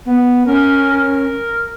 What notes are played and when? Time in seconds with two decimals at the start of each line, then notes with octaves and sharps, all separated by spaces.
0.06 B3
0.46 C#4 A#4
0.91 A#4